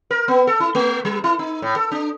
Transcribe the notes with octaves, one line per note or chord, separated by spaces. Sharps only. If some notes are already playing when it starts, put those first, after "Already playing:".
A#4
B3
A4
E4
A3
G3
E4
D#4
A2
A4
D4